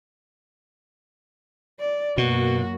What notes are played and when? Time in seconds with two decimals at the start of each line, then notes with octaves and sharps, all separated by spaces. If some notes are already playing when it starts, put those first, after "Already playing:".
1.80 D5
2.18 F#2 B2 F#3 A#3 F#4